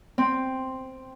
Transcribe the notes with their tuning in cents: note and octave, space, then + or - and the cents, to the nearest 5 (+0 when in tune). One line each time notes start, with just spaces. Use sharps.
C4 +0